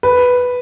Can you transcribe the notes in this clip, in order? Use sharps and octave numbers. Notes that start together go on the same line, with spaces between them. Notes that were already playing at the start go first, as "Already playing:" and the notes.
B4